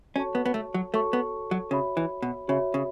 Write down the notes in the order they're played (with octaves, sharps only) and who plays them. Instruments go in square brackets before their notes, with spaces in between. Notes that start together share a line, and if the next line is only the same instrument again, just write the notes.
[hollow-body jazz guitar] C#4 [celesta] F#4 A4 C#5 A5 C#6
[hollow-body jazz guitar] B3
B3
A3
F#3
[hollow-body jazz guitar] A3 [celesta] F#4 A4 C#5 A5 C#6
[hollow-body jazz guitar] B3
F#3
[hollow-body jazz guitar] C#3 [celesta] F#4 C#5 E5 B5
[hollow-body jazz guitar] E3
B2
[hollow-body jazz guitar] C#3 [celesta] F#4 C#5 E5 B5
[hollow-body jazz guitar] C#3